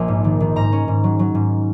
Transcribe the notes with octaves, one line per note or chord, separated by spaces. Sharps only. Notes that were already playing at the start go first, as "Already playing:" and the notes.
Already playing: A#1 A#3 G#5 A#5
G#2
D#3
D#3
G#2 A#5
C#4
G#2
F#3
F#3
G#2